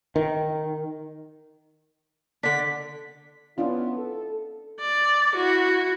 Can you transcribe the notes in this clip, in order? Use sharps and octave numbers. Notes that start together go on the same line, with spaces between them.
D#3
D3 D4 B6
B3 C#4 D4 E4 F4
A4
D5
E4 F#4